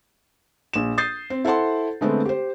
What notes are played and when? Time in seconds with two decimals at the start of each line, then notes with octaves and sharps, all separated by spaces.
0.73 A#1 E7
0.98 D#6 G6 A6 C7
1.30 C4
1.45 E4 A4 C5 F#5 A5 C6
2.01 D3 G#3 A3 B3 C4
2.26 G4 C5